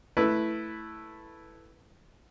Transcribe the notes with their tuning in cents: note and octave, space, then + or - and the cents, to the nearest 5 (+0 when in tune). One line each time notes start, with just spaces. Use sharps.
A3 +0 E4 +0 B4 +0